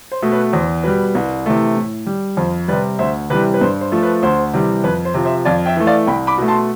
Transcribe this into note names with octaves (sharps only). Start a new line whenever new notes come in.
C5
B2 A3
B4
E2 C5
B2 G3 B4
C2
C3 E3 A3
A2
G3
F2 C5
C3 G3 B4 D5
D2 C5 E5
C3 E3 G3 B4
B4
G2 C5
C5
F3 A3
B4
D2 C5
C3 E3 G3
F2 B4
C5
C3 F3
C5 E5
F2 D5 F5
E5 G5
E3 A3
D5 F5
C2 G5 B5
B5 D6
B2 A3
A5 C6